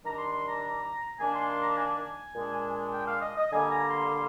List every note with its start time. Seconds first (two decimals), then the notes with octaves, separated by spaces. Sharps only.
0.04 D#3 G3 D4 A#5
0.18 C6
0.32 C6
0.47 A#5
1.20 D#3 A#3 D4 G#5
1.34 C6
1.49 C6
1.63 A#5
1.78 G#5
2.35 A#2 G#3 D4
2.93 G5
3.08 F5
3.22 D#5
3.37 D#5
3.52 D3 G3 A#3 G#5
3.71 A#5
3.89 C6
4.10 C6